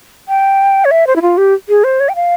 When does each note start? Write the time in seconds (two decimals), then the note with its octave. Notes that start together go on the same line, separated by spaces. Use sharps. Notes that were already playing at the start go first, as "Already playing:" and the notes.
0.28 G5
0.85 C#5
0.91 E5
1.07 C5
1.16 E4
1.22 F4
1.37 G4
1.69 G#4
1.84 C5
2.00 C#5
2.09 G5
2.15 F5